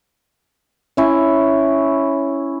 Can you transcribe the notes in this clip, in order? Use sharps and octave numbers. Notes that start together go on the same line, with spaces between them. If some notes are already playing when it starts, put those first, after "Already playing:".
C#4 E4